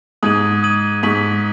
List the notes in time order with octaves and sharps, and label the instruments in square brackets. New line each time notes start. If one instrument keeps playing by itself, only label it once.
[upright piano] G#2 [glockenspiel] D#6 G#6 D#7 F#7
[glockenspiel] D#6 G#6 D#7 F#7
[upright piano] G#2 [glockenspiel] C#6 B6 F#7